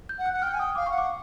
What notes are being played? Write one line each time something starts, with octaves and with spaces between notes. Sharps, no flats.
G6
F#5
F#6
F#5
G5 F6
G#5
G5 D#6
F5 D6
F#5 C#6
D6